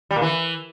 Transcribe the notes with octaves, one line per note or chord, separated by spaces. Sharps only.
G3
A#2
E3